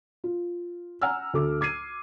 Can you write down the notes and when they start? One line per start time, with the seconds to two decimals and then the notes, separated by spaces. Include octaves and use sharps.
0.24 F4
1.02 F#5 G#5 A#5 E6 F6
1.34 D2 A4 D6
1.61 D6 G#6 C7 D#7